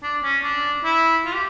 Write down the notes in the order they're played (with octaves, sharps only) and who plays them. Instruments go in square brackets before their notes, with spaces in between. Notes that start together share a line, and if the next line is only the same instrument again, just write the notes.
[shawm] D4
C#4
D4
E4
F4
G4